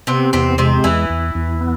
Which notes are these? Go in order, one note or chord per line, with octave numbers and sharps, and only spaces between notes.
C3 B3 C4
E2 C3 C4
C3 G#3 C4
E2 E3 E4
E2
E2
B3